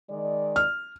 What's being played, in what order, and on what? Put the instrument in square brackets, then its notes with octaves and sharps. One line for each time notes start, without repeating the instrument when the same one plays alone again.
[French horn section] D#3 G#3 D5
[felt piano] F6